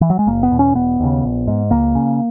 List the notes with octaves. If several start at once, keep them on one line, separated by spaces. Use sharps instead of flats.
E3
F#3
G#3
F#1 A#3
B3
E2 B2
C#4
E1 B3
D#2 C#3
A#1
G#2
C#2 A#3
C#3